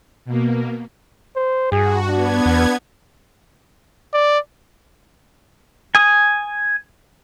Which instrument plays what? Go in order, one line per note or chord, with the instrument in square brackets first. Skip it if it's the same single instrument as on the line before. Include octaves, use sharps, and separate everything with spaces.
[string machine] B2 A#3
[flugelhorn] C5
[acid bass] G2 [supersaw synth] F#4 [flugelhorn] G#4
[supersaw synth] B3 G#6 [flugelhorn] D4
[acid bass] E2
[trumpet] D5
[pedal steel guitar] G#5 D#6